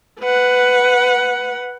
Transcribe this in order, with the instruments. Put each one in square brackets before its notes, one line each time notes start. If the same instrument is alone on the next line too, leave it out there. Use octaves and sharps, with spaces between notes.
[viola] B4 F#5